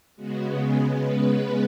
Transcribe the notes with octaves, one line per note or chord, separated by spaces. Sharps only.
C#3 G#3 B3 F#4
G#4
B4